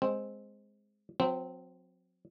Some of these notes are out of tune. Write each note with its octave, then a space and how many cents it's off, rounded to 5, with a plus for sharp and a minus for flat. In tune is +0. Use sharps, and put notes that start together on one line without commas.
G#3 +0 C4 +0
F#3 -40 C4 -15